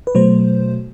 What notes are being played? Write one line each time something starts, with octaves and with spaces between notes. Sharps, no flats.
B4
B2 F#3 A3 C5